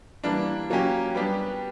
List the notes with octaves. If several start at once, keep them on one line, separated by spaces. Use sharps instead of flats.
E3 G3 A#3 D4
F#3 A#3 C#4 G4
G3 B3 D4 G4